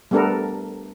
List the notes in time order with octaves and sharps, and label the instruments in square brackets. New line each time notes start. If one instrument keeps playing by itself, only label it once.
[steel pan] G3 A3 B3 D4 A4 A#4